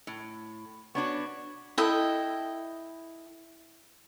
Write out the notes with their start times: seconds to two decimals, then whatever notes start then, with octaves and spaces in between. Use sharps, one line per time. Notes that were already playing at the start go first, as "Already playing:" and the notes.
0.07 A2
0.95 B3 D4 F#4 C#5
1.78 E4 A4 D#5 G5